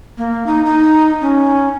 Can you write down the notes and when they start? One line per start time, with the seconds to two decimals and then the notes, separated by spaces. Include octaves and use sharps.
0.18 A#3
0.46 D#4
0.65 D#4
1.21 C#4